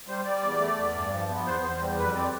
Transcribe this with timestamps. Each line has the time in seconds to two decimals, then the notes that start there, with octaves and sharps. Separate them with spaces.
0.08 G3 C5
0.25 G3 D5
0.42 E2
0.60 A3
0.77 E2
0.95 G2
1.11 F3
1.29 B3
1.46 E2 C5
1.63 E2
1.81 G3
1.98 F2 B4
2.15 C4 D5